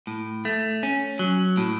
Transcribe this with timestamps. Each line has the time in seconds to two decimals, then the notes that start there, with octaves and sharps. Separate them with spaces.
0.07 A2
0.45 A3
0.83 C#4
1.19 F#3
1.57 A2